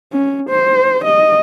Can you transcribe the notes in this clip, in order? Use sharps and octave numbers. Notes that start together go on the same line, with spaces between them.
C#4
C5
D#5